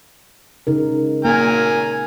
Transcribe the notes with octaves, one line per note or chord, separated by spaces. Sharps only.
C#3 D#4 A#4
A#3 A#4 G#5